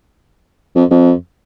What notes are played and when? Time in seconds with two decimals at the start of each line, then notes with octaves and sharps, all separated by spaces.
0.75 F2
0.91 F2